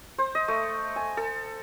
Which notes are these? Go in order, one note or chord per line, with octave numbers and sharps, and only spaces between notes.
C5
D#5
A3
G#5
A4